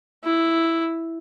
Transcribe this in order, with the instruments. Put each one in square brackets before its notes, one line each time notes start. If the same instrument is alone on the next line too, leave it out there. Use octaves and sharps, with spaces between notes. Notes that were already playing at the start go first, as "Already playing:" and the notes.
[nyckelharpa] E4